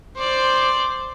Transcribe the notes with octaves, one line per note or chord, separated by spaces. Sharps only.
C5 D5